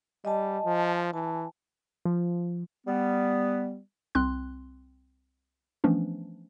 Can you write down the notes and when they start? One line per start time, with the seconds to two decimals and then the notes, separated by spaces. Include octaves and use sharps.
0.25 G3 D#5 G#5 A5
0.66 F3
1.13 E3 G#5 A5
2.05 F3
2.86 G3 B3
4.15 C2 C4 C6 F#6
5.84 E3 F3 A3 B3 C#4 D4